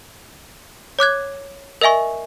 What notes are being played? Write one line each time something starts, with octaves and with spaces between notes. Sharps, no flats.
C#5 D6 F#6 G#6
A#4 D#5 E5 G#5 C#6